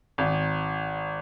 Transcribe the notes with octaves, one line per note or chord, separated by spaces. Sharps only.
G#1